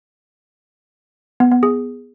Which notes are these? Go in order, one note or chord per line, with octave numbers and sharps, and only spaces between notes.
B3
B3
G#4